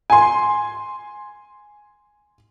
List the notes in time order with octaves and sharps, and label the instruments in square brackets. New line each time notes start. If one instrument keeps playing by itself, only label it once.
[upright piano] G#5 C6